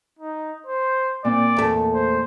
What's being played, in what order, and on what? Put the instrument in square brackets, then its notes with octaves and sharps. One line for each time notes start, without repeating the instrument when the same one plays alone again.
[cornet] D#4
C5
[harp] A#2 C4 [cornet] D5
[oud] E2 A3
[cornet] C5